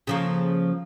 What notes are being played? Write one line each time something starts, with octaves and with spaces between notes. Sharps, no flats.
C#3 F3 A#3